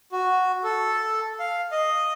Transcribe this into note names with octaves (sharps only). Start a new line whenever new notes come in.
F#4
A4
F5
D#5